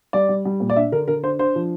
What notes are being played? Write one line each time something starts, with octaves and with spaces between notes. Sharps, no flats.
G3 D5
G3
G3
A#2
D5
D4 E5
D3 A#4
D3 A#4
D4 C5
D4 C5
F3